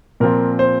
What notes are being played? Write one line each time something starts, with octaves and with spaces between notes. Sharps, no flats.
A#2 F3 C4 F4 A#4
C5